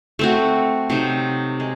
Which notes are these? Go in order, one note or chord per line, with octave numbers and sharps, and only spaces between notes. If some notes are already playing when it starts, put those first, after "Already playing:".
A3 C4 F#4
C3 F#3 C4 D#4
G#3